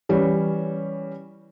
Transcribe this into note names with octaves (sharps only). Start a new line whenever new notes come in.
E3 G3 C#4